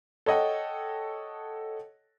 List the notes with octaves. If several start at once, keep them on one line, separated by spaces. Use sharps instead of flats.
A4 C#5 D#5 F#5 G5